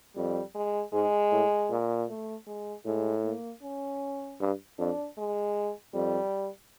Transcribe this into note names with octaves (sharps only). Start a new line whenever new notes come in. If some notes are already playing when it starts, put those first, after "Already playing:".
F2 G3
G#3
G#2 G#3
A2
A#2
A3
G#3
A2 G#3
A#3
C#4
G2
F2 D4
G#3
F2 G3